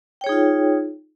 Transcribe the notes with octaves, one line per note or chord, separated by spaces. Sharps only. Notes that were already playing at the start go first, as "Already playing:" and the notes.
D#4 F4 G#4 C#5 G5